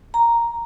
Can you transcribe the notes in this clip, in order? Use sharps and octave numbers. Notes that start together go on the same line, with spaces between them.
A#5